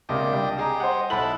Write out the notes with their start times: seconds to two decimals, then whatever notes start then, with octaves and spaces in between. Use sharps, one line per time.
0.09 C#2 C3 A#3 D4 D#5 G5
0.33 G3
0.58 G4 G#4 D#5 G#5 A#5
0.80 C5 F#5
1.10 B1 E4 A4 F#5 B5 F#7